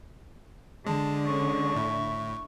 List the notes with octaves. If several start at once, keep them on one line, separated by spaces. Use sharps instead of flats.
D3 G#3 A5
C#4 C#6
A2 E4